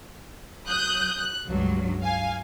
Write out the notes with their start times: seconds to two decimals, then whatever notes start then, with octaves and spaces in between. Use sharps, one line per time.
0.67 F#3 D#6 F#6 G6
1.18 F#6
1.48 C#2 G2 F#3
2.03 F5 G#5